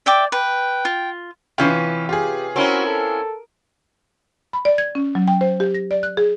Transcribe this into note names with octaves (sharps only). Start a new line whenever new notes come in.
D5 E5 G5 D6
B4 G5
F4
C3 E3 C#4 F4 B4
F4 G4 G#4
C4 C#4 E4 F#4 A#4
A4
B5
D5
G#6
C#4
F#3
G5
C5
G4
A#6
D5
F#6
G#4